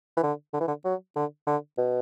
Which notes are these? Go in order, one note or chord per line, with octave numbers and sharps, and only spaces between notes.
E3
D3
D3
E3
D3
F#3
D3
D3
B2